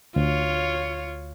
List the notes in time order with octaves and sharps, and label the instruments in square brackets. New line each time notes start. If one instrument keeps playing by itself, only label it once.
[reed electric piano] D2 [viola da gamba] F4 C#5